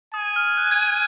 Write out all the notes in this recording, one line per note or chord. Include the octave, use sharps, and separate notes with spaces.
G#5 D#6
F6
F#6
G#6
G#6